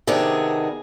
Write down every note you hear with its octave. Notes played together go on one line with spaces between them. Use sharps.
C3 D#3 B3 D4 G#4